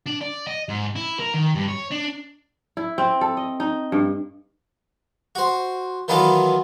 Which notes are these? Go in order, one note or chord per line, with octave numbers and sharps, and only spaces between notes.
D4
D5
D#5
G#2
E4
A#4
D#3
G2
C#5
D4
E4
C4
A4
D#5
D#4
G2
F#4 C5
D#3 E3 F#3 B3 F4 A4